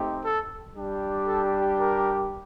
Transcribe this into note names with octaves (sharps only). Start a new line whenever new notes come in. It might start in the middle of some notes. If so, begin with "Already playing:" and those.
Already playing: A3 C4 D#4 G4
A4
G3 D4 G4
A4
A#4